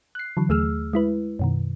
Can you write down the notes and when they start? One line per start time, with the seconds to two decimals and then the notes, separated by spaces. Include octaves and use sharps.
0.15 F#6 C7
0.37 D3 E3 F#3
0.49 D#2 A3 G#4 E6 F6
0.93 G#3 E4 B4
1.39 F#2 B2 D#3